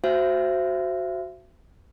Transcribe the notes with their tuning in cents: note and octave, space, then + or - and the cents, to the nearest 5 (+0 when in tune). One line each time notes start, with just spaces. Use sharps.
F#4 +0 C5 +0 E5 +35